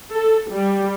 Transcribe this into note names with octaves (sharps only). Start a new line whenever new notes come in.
A4
G3